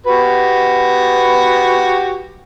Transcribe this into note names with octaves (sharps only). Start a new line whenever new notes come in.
F#4 G4 B4